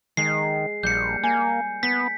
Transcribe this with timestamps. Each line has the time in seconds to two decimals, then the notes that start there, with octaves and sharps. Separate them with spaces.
0.17 D#3 G#3 C7
0.83 A#1 G3 A#3 G6 C#7
1.23 A#3 G#5
1.83 B3 B6